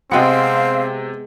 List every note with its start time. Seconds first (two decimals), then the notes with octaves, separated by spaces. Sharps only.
0.11 C3 G#3 B3 C4 F5 G5 C#7